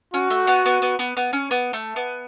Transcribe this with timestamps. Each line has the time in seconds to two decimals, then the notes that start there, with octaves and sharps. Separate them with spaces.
0.14 C#4 F#4
0.30 A3
0.47 B3
0.66 B3
0.82 B3
0.99 B3
1.17 B3
1.33 C#4
1.51 B3
1.73 A3
1.96 B3